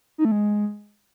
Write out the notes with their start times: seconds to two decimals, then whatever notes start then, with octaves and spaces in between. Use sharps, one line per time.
0.18 D#4
0.25 A3
0.32 G#3